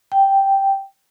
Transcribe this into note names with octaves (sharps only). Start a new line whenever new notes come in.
G5